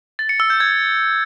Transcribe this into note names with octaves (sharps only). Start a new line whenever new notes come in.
A6
C#7
E6
G6
G#6